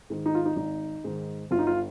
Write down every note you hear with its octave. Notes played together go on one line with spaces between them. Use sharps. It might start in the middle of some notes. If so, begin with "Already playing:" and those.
G#2 D#3
D#4
F4
D#4
G#1 D#4
G#2 D#3
G1 F4
D#4
F4